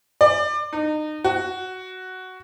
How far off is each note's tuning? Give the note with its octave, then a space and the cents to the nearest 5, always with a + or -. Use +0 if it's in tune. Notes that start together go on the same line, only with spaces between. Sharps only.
D5 +25
D#4 -30
F#4 +5